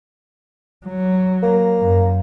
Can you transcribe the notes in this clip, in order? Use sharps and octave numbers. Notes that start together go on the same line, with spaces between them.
F#3
A#3
F#2